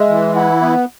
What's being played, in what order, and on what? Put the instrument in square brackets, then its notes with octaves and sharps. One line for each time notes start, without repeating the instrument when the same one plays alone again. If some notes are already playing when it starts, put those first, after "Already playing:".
Already playing: [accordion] G#3 [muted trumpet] E5
[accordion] E3
[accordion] E4 [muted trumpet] F#5
[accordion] B3